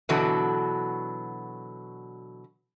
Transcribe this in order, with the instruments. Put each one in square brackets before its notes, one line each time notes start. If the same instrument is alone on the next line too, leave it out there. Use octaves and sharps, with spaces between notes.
[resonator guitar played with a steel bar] B2 D3 E3 F#3 F#4 A4